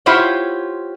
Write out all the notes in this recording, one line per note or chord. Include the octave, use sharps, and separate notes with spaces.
E4 F4 G4 C5 C#5 F#5